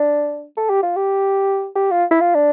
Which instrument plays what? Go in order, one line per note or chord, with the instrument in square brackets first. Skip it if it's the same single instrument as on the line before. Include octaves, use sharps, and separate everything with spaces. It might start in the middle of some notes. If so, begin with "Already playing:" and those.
Already playing: [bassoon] D4
A4
G4
F4
G4
G4
F4
E4
F4
D4